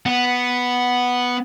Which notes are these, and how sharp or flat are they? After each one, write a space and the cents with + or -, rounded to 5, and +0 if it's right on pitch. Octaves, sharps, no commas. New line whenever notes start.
B3 +0 F#5 +0